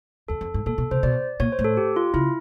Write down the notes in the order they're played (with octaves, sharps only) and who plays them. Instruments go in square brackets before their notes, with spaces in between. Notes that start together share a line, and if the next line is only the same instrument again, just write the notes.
[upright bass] E2 [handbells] A4
[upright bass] F2
G#2
[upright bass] A#2 [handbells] A4
[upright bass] B2
[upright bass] C3 [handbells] C5
[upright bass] B2 [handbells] D5
[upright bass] A#2 [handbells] C#5
[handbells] C5
[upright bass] A2
[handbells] A4
G4
F4
[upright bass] C#3 [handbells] E4